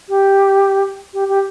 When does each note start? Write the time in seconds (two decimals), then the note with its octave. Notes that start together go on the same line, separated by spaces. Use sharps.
0.09 G4
1.14 G4
1.29 G4